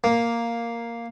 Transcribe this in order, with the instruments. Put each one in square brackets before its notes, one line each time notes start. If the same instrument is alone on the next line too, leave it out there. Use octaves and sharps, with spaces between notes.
[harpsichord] A#3